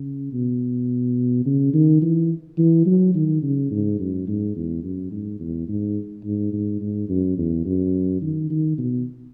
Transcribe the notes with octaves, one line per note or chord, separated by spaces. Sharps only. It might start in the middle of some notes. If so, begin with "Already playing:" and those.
Already playing: C#3
B2
C#3
D#3
E3
E3
F#3
D#3
C#3
G#2
F#2
G#2
E2
F#2
G#2
E2
G#2
G#2
G#2
G#2
F#2
E2
F#2
D#3
D#3
B2